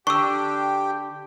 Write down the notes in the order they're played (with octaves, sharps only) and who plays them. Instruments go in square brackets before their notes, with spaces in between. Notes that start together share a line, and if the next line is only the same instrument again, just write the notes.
[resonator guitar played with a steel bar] D3 D4 [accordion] G4 G5 [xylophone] C#6 E6